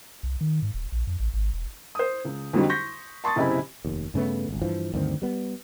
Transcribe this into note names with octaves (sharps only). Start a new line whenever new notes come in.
C2
D#3
G#2
D#1
A#1
F2
A1
G#1
E1
C5 D#6
C#2
F2 D3 F#3 G3 D#4 F#4
C6 C#6 G6 A#6 B6
A5 C6 C#6 D#6 A6
F#1 C3 E4 D#5 G#5 B5
F1 D#2
G2 C#3 A3 B3
G#1 C#2
G2 E3 F3
D2 G2 D#3 C4
G3 B3